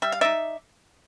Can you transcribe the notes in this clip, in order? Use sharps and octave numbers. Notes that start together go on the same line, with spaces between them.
G3 E5
F5
D#4 D5 E5